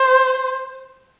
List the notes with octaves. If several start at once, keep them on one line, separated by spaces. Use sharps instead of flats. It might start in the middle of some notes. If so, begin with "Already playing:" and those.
Already playing: C5